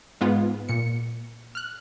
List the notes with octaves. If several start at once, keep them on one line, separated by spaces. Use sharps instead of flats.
G#2 G#3 B3 F4
A#2 C#7
F6 F#6